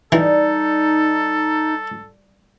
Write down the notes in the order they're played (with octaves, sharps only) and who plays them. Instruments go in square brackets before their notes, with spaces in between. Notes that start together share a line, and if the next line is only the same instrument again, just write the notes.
[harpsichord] E3 [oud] G3 [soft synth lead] D#4 [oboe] A4